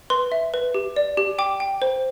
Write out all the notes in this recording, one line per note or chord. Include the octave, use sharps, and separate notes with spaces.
B4 C6
E5
B4
G4
D5
G4
G5 D6
G5
C5